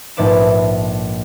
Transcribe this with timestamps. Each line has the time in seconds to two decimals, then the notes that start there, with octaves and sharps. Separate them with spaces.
0.17 A#1 G#2 A3 B4 D6 E7